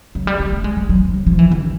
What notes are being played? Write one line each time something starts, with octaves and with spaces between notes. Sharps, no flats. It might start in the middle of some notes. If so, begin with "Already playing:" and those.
F#3
G3
G#3
A3
G#3
G3
F#3
F3
F#3
F3
E3
D#3